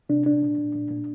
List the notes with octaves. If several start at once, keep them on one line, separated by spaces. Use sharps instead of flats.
C3 D4
A#2 D4
A#2
A#2
A#2
A#2